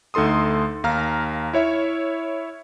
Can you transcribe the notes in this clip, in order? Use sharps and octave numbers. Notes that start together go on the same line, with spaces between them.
D2 D#4 A4 C6 D#6
D#2 F5 A#5 F6
E4 C#5 E5